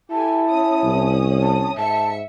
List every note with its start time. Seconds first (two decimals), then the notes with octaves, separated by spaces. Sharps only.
0.11 E4 G4 A4 G#5 A5
0.49 C#4 D#6
0.83 C2
1.41 A5
1.77 G#2 E5 A5 C#7